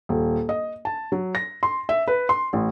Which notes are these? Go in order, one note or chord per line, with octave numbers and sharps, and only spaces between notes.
D#1
D#5
A5
F#3
A#6
C6
E5
B4
C6
A1